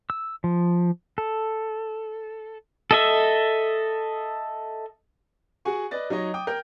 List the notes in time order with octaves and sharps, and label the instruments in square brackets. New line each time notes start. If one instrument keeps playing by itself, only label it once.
[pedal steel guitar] E6
F3
A4
A4 D#5 E5
[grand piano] F#4 G#4 F#5 G#5 C#6
B4 D5 D#5 A6
F#3 D#4 C#5 D#5
G5 D6 D#6
A#4 G5 G6